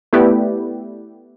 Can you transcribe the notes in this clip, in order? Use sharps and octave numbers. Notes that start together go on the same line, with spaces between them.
A3 B3 E4 G4 B4 D5